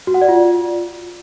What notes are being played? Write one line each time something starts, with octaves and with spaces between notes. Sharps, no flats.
F#4
F#5
D5
F4